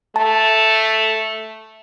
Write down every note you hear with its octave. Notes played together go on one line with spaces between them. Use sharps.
A3 A5